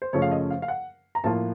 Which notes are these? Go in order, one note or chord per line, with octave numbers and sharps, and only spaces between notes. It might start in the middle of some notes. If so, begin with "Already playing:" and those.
C5
F#2 C#3 F3 A3 C#4 C#5
F5
D#5
F5
F5
F#5
A#5
A2 F3 A#3 F4 A5